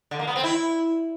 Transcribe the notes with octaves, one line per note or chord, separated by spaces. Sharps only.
D3
A#3
B3
C4
E4